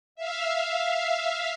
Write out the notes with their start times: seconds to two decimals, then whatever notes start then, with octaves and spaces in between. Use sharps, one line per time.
0.15 E5 F5